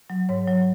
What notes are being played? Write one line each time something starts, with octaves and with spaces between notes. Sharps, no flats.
F#3
G#2 C#5
F#3